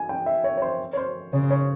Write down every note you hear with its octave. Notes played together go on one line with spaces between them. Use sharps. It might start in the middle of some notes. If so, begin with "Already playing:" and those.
Already playing: G#5
G5
E5
C#5
C#5
C5
C#5
C5
C#3 C#5
C#5